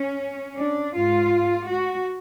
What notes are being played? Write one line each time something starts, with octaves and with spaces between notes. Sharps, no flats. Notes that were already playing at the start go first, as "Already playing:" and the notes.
Already playing: C#4
D4
G#2 F4
F#4